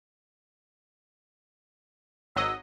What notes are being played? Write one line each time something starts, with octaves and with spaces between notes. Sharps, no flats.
G#1 F#3 D#5 E6